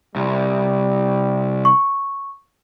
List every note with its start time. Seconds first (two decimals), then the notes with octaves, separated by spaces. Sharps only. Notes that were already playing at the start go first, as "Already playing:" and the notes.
0.16 C2 G3
1.65 C#6